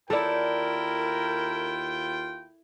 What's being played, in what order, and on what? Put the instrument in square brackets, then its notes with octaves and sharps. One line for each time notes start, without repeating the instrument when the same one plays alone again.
[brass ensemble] D#2 F4 G5 [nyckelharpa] E4 [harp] A4 D5 [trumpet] A#4